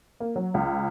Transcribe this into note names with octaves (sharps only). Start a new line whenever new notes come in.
A#3
F#3
C#2